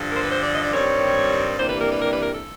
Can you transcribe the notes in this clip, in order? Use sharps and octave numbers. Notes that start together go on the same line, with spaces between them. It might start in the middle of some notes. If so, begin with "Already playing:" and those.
Already playing: G2 D3 F3
A#4
C5
B4
C5
D5
D#5
D5
G2 D#3 G3 C4 C#5
C3 E3 G3 A#3 D4 C5
B4
A#4
B4
A#4
B4
A#4
A4